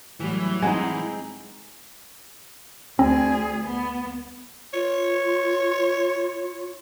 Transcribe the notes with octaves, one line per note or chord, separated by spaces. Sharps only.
A2 E3 F#3 G3
G#3 C4 D#4 F#5 G#5
D2 C4 G#4
B3
F4 C#5